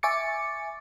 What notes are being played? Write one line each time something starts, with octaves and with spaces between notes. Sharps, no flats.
E5 G#5 C#6 D6 A6 C#7